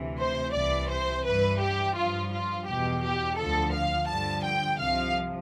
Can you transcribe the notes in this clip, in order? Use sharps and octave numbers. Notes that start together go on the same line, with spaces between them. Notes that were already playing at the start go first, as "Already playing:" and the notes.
Already playing: D2 C3 E3
C5
C2 C3 E3 D5
C5
G2 E3 B4
G4
G2 F3 F4
F4
E2 B2 G4
G4
D2 D3 F3 A4
F5
G2 D3 F3 A5
G5
C2 C3 F3 F5